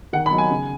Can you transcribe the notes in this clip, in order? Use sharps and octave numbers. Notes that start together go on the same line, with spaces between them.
D#3 F#5
B5
F#3 D#4
G#5
C#3